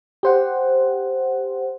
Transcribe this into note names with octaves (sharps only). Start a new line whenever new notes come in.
G4 C5 F#5